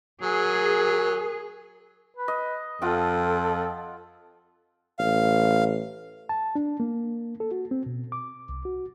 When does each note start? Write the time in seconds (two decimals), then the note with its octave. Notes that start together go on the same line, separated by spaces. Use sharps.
0.21 F#3 G#4 A#4
2.16 B4
2.28 D#5
2.82 F2 F4 A4 F#5 G5
4.99 A1 F5
6.29 A5
6.56 D4
6.80 A#3
7.40 A4
7.51 F#4
7.71 C4
7.86 B2
8.12 D6
8.49 C2
8.65 F#4